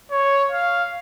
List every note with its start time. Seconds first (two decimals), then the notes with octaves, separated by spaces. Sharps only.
0.11 C#5
0.52 F5